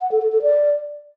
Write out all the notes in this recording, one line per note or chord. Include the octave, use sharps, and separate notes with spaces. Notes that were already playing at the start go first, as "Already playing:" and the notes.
F#5
A4
A4
A4
D5